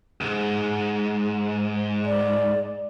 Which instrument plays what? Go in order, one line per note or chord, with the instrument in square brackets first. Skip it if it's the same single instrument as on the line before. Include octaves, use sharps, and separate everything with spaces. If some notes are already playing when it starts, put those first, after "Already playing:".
[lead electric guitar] C#2 G#2
[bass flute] D5